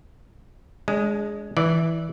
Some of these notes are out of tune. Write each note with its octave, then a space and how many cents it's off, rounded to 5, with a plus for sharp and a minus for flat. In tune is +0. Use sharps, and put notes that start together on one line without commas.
G#3 +0 D4 -35
E3 -10 D5 +0